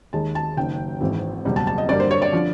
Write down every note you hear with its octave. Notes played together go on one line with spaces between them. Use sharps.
D#2 D#3 G#3 A5
A5
F#1 F#2 D#3 G5
G#1 G#2 E3
F#1 E2 B2 G3
A5
A5
D#5
G2 D3 G3 A#3 D5
C5
C#5
D5
D3 F3